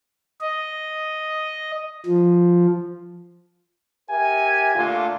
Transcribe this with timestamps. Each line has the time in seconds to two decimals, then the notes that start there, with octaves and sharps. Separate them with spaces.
0.41 D#5
2.06 F3
4.10 G4 A#4 E5 G#5
4.75 A#2 D3 A3 F4